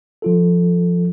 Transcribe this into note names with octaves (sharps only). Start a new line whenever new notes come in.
F3 F4 A4